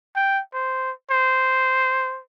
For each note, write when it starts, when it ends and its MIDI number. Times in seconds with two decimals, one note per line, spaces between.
0.16 0.41 79
0.54 0.92 72
1.10 2.21 72